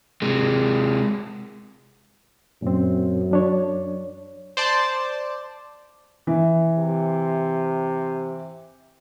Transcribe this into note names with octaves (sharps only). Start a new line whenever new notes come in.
C3 G#3
F#2 A#2 C4
F#3 D4 C#5
C5 D5 A5
E3
C3